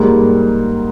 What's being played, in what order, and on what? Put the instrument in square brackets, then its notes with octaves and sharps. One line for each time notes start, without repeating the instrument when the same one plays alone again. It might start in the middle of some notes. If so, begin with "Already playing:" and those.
Already playing: [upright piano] G#2 G3 A#3